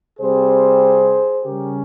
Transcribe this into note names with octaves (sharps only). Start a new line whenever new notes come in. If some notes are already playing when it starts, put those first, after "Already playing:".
C3 G3 C4 G#4 C5
C#3 G3 C#4 G4 A#4